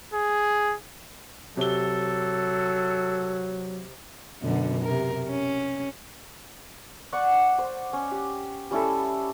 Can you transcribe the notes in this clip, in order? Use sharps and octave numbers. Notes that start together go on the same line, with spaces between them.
G#4
C3 F#3 A4 G7
F#2 B2 D3
C3 A#4
C#4
D5 F#5 C#6
C5
C#4
G4
G3 C#4 E4 A4